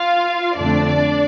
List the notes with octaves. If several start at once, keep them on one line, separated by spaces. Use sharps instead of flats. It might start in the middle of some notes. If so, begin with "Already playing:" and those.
Already playing: F4 F5
F2 D3 A3 C4 D4 D5